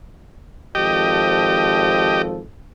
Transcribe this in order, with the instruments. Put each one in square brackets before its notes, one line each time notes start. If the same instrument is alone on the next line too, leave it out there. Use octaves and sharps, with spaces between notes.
[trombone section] G#1 F3 A4 [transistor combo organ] G4 D#5